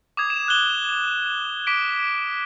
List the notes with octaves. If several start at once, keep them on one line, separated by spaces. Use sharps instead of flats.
D6 D#6 G#6
E7
F#6 G7
D6 B6 D7